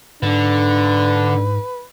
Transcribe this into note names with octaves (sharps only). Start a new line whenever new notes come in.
G#2 D3 D4 B4